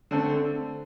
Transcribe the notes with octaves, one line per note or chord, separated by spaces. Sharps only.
D3 A3 C4 A4